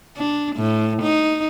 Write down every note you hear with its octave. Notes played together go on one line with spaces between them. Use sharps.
D4
A2
D#4